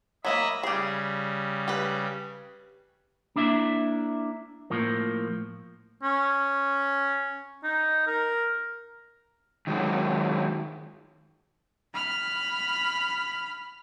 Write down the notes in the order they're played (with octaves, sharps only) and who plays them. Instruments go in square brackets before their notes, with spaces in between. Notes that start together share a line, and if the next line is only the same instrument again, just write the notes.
[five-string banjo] F#3 G#3 A#3 [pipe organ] D#5 E5 B5
[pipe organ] C#3 G3 [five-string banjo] G4 G#4
[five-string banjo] G4 B4
[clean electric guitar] A#3 D4 E4 E5
A2 F3 A#3
[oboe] C#4
D#4
A#4
[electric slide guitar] D#3 F#3 G#3
[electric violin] B5 F6